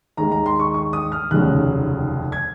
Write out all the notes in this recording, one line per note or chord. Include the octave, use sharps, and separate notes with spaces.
D#2 D#3 G#3 A#5
A#5
C6
C#6
C#6
D#6
F6
F1 D#2 C#3 F#3 F#6
G#6